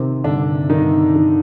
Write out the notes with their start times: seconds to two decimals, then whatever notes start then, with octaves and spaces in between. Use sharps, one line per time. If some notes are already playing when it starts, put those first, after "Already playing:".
Already playing: C3 D#3 C4
0.24 G2 D3 D4
0.70 G2 D#3 D#4
1.16 D#3